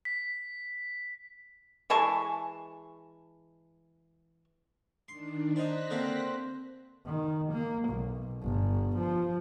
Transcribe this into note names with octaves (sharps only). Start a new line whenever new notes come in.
B6
E3 G#3 A5 C#6
D#3 D4 C6
D4 D#4 C5 F#6 A#6 B6
D3 A#3 C4 D4
D#3
A#3
B1
G1
F3